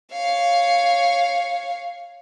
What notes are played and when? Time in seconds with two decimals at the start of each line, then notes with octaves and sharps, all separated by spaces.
0.12 C#5 F5